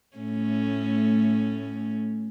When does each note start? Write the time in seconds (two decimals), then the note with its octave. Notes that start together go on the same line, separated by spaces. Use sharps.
0.17 A2 A3 C#4